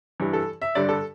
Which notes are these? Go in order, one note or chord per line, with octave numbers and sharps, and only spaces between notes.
G2 E3 G3
A4
E5
G2 D3 G3 D5
A4